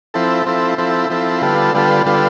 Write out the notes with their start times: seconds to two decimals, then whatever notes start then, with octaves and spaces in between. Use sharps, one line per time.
0.14 F3 C4 E4 A4
0.46 F3 C4 E4 A4
0.78 F3 C4 E4 A4
1.10 F3 C4 E4 A4
1.42 D3 G3 B3 F4 A4
1.74 D3 G3 B3 F4 A4
2.06 D3 G3 B3 F4 A4